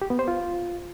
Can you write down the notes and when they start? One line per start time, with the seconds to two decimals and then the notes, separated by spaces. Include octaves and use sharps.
0.02 G4
0.10 B3
0.19 C5
0.28 F4